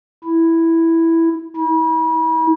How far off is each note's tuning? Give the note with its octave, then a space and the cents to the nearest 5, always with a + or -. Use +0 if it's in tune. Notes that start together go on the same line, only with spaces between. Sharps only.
E4 +0
E4 -40